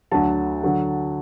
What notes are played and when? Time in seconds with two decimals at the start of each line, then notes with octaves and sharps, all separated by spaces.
0.12 D2 D3 F#3 A5
0.64 D3 F#3